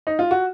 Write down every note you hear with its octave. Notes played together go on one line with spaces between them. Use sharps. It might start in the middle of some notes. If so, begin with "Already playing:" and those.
D#4
F4
F#4